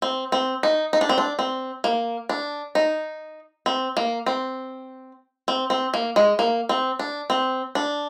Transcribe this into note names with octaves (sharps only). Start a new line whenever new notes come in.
C4
C4
D#4
D#4
D4
C4
D4
C4
A#3
D4
D#4
C4
A#3
C4
C4
C4
A#3
G#3
A#3
C4
D4
C4
D4